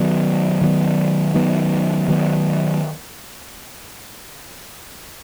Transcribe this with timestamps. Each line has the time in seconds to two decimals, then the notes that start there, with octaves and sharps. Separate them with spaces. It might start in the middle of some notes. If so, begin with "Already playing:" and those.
Already playing: D#3 F#3 B3
0.61 D#3 F#3 B3
1.34 D#3 F#3 B3
2.08 D#3 F#3 B3